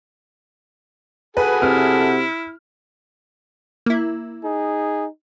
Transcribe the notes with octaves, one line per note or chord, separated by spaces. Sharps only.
F#4 G#4 A4 B4
C3 E4 F6
A#3 E4
D#4 G#4